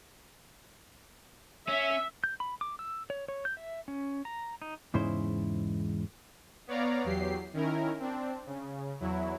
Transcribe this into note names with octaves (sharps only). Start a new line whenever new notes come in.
C#4 E5
G6
B5
D6
E6
C#5
C#5
G6
E5
C#4
A#5
D#4
E2 G#2 C#3 E4 C5
B3 C#5 D5 F5 A#5
E2 F#3 G4 C7
D#3 C#4 E4 A#4
C4 D4
C#3
E2 F#3 E4